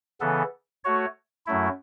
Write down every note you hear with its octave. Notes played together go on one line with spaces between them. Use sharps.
C#3 E3 B3 A4
A3 F#4 C#5
F#2 F#3 A3 E4